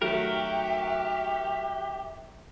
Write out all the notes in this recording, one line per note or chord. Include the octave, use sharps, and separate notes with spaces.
D#3 F#3 A3 F#4 G4 A#4 E5